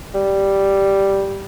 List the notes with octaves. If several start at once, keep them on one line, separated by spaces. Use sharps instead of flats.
G3